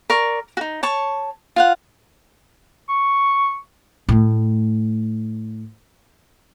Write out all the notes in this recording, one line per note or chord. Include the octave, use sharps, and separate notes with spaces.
A#4 D5 C#6
D#4 F#4
C#5 A5 C#6
F4 F5 F#5
C#6
A2 A3